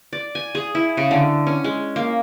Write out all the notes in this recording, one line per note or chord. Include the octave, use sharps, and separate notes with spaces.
D5
G#5
G#4
E4
C#3
D3
C#4
G#3
A#3